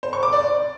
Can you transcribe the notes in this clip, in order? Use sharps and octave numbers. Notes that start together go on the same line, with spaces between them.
C5
C#6
D6
D5